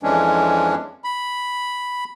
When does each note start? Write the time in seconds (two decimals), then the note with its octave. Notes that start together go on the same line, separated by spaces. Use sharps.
0.03 F2 E3 G#3 C#4 D4
1.04 B5